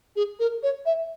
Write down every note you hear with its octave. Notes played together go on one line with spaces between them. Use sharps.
G#4
A#4
C#5
E5